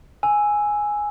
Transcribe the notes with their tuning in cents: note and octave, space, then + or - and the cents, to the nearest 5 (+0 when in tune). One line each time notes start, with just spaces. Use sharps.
G#5 +0 E6 +0